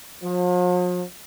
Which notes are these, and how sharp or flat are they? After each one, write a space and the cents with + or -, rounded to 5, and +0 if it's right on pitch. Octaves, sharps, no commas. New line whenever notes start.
F3 +45